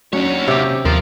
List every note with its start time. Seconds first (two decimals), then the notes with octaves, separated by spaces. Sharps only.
0.13 D#2 F#3 C#4 D4 C#5 F#5
0.48 C3 G4
0.85 D#2 F3 A#4 F5